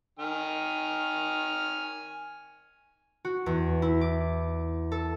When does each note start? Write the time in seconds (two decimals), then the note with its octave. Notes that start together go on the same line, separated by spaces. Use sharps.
0.19 D#3 G#5 F6
3.25 F#4
3.46 E2
3.82 E4
4.01 D6
4.92 A4